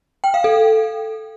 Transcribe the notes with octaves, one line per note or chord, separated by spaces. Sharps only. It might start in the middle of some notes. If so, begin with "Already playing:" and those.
G5
F5
A4